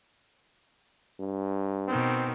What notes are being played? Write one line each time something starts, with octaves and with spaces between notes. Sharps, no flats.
G2
B2 D#3 C4